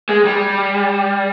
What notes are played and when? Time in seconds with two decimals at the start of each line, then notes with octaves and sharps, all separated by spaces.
0.09 G#3
0.25 G3